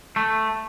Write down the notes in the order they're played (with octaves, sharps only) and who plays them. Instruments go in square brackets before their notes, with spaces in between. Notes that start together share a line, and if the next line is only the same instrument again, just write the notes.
[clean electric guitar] A3